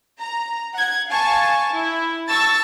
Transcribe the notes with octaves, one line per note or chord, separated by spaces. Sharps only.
A#5
F#5 G#6
F5 G#5 A5 C#6
E4
A5 C#6 E6 A6